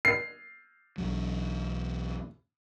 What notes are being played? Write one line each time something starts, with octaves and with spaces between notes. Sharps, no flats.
C7
B1 E2 F#3